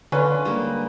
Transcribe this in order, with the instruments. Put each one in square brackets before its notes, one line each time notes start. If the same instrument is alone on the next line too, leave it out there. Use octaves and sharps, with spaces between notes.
[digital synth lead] D3 [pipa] C#4 F4 [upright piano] B4
[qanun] G3 G#3 A#3